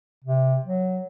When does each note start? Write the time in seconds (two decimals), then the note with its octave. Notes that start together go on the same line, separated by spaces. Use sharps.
0.25 C3
0.66 F#3